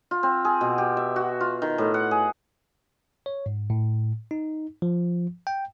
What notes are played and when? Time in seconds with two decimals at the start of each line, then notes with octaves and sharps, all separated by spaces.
0.11 F4
0.23 C4
0.45 G#4
0.61 B2
0.78 G4
0.97 E5
1.16 F#4
1.41 F4
1.62 D#3
1.78 A2
1.94 F#5
2.11 G#4
3.26 C#5
3.46 G#2
3.70 A2
4.31 D#4
4.82 F3
5.47 G5